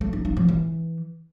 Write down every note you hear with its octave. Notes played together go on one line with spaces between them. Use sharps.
A3
D#4
D#4
F3
E3